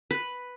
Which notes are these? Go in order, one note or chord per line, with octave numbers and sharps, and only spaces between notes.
B4